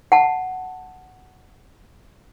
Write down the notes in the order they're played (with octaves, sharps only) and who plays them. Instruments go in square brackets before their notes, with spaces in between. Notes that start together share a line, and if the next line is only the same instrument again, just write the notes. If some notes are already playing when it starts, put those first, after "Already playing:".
[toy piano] F#5 A5